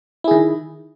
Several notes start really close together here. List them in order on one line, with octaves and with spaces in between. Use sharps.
E4 G#4 D#3